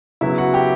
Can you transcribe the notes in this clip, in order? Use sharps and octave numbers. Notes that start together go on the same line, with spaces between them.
C#3 F#3 B3 E4 E5
F#4 F#5
G4 G5